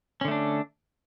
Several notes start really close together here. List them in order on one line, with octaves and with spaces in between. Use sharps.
C#4 D3 A3 D4